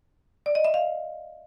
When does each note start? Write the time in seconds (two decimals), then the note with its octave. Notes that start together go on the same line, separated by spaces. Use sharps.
0.46 D5
0.55 D#5
0.64 E5
0.74 F5